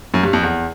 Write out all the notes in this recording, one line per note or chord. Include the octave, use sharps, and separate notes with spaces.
F#2
G2
F2
E2